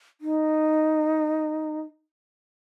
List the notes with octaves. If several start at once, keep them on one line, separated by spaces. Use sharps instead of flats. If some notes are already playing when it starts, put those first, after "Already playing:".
D#4